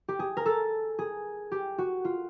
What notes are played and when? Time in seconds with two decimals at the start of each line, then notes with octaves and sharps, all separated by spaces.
0.08 G4
0.19 G#4
0.37 A#4
0.46 A4
0.99 G#4
1.52 G4
1.78 F#4
2.05 F4